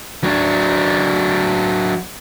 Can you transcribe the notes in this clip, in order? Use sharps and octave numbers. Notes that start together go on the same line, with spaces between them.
F#3 D4